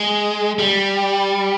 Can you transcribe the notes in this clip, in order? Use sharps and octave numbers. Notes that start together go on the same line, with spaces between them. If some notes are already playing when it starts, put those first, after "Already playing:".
Already playing: G#3
G3